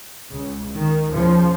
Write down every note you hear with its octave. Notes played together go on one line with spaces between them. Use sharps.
C#2 C#3
D#3
D#2 C#3 F3